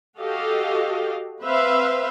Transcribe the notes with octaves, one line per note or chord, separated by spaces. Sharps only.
F#4 G4 A4 D#5 F5
C4 B4 C5 E5 F5